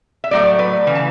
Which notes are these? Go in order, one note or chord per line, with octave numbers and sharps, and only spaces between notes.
E5
A2 F#3 A3 D5
B4
C#3 E3
A5